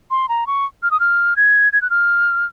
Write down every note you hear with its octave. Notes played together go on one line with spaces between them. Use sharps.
C6
A#5
C#6
F6
D#6
F6
G#6
G#6
F#6
F6